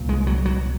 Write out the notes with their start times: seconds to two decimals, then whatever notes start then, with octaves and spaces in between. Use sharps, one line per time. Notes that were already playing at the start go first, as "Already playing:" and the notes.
Already playing: C2 A#2
0.09 G#3
0.27 F#3
0.45 F#3